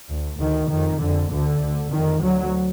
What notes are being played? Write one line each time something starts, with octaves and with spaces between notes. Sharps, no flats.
D2
D2 D#3
F2 D#3
F2 D3
D2 D3
D2
F2 D#3
D2 F#3